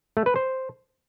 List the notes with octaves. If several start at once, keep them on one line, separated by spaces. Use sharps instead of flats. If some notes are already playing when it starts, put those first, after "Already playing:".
A3
B4
C5